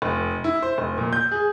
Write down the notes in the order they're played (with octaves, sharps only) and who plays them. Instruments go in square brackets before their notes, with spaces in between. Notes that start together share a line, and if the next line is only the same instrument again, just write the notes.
[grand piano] F1
E4
C5
F1
A#2
G6
G#4